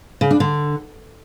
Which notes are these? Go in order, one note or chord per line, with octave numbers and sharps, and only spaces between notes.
C#3
D4
D3